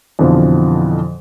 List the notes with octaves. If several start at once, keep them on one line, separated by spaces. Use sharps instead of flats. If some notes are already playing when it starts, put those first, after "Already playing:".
F2 B2 D3 E3 F3